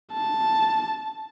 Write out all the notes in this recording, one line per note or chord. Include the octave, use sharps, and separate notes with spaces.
A5